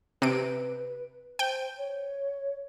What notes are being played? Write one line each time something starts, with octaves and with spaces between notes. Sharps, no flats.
C3 B4 D7
C5 G5
C#5